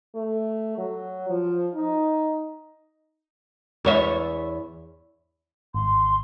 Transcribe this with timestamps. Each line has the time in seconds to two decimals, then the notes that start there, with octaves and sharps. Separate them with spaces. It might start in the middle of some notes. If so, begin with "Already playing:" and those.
0.15 A3
0.78 F#3
1.30 F3
1.75 D#4
3.85 E2 C#5 E5
5.74 G#1 C6